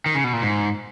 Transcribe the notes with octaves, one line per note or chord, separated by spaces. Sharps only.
D#3
C#3
B2
A#2
G#2